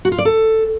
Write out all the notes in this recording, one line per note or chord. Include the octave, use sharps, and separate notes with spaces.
F#4
F4
D5
A4